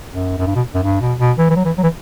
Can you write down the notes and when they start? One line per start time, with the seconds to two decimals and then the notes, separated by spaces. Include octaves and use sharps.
0.11 F#2
0.39 F#2
0.47 G2
0.55 B2
0.74 F#2
0.83 G2
1.01 B2
1.19 B2
1.38 E3
1.50 E3
1.56 F#3
1.65 E3
1.78 F#3
1.83 E3